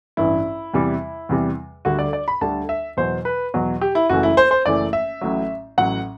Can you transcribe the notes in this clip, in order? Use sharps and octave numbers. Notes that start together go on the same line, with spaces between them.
A1 G2 E3 E4
E2 C3 E3 G3
E2 C3 E3 G3
D2 D3 G3 F#4
D5
D5
B5
D2 D3 G3 A5
E5
E2 B2 F#3 C5
B4
E2 B2 F#3
G4
E4
F#1 F#2 E3 A3 F#4
E4
C5
C5
F#1 F#2 E3 A3 D5
E5
A1 A2 F#3
A1 A2 F#3 F#5